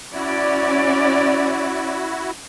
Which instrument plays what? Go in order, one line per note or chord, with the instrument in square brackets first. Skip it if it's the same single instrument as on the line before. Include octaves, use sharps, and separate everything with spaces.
[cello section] C#4 D5 [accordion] E4 F#4